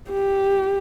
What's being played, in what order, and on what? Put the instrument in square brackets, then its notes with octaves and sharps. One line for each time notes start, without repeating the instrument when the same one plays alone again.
[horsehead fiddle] G4